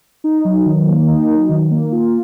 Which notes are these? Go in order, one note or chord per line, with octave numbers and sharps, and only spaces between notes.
D#4
F#3
D#3
A#3
D#4
F#3
D#3
A#3
F4